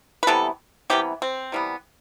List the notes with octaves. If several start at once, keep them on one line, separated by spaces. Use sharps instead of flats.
B4
C3 E3 G3 B3 A4
C3 E3 G3 B3 G4
C4
C3 E3 G3 B3